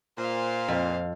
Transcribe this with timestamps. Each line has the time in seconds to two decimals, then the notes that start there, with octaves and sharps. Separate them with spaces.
0.17 A#2 C5 F5
0.68 F2